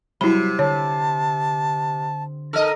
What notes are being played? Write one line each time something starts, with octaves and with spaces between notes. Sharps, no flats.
C3 F#3 G3 E4 F#4 B5
D3 C#5 A5
D#4 A4 A#4 D#5